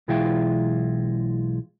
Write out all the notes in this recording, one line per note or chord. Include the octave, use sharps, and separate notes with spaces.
B1 E3 G#3 E4 F4 G5